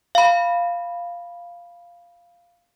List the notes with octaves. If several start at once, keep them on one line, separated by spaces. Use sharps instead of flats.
F5 B5